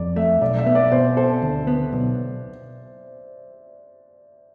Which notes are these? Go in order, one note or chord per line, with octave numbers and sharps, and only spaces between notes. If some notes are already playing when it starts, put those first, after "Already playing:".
Already playing: F2 D5
A3 E5
B1 D5
E5
B3
D5
B2 C5
A4 C5
D2
B3
B1